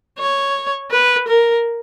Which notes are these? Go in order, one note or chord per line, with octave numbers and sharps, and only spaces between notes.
C#5
B4
A#4